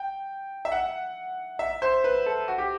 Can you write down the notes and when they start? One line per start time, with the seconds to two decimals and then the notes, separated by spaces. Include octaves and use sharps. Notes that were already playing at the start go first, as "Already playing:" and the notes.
Already playing: G5
0.65 E5
0.72 F#5
1.59 E5
1.82 C5
2.04 B4
2.26 A4
2.48 F#4
2.58 G4